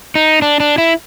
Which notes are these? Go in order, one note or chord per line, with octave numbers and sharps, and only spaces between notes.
D#4
D4
D4
E4